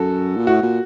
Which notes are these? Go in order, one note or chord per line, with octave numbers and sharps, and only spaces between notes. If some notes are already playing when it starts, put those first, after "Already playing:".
Already playing: F#2 F#4 A4
A#2
A2 F#4
A#2